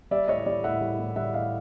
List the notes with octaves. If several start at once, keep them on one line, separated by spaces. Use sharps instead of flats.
G3 D5 E5
A2 C#5 D#5
G3 D5
A2 E5 F#5
G3
A2
G3 E5 F#5
A2 D#5 F5